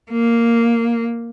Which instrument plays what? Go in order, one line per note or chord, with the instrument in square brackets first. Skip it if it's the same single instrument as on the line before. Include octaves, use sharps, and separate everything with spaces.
[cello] A#3